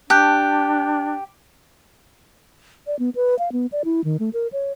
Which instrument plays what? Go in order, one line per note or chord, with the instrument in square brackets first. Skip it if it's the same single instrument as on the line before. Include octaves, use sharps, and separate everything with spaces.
[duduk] D4 [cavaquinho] G4 [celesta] A5 F#6 G6
[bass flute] D5
B3
B4
F5
B3
D5
E4
D#3
A3
A#4
C#5